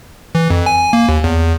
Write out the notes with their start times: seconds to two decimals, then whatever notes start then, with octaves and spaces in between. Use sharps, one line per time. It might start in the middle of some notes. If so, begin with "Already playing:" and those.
0.35 E3
0.50 F2
0.66 G#5
0.79 G#5
0.93 A#3
1.09 D#2
1.24 E2